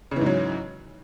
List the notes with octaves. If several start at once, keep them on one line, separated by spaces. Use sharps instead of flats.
G#2 C#3 E3 F#3